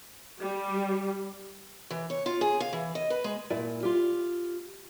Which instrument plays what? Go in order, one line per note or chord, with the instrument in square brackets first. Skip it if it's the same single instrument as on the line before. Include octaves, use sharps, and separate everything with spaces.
[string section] G3
[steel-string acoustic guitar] E3
C#5
F4
G#4
F5
E3
D#5
B4
G#3
[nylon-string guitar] A#2 E4 D5 G#5
F4 G4